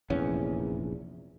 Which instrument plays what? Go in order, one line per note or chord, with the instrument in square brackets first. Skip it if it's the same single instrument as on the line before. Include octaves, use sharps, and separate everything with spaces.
[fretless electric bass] F1 A#1 E2 C#4